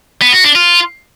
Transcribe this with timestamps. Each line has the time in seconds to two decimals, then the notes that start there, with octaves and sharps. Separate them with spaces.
0.22 B3
0.33 F#4
0.44 D4
0.55 F4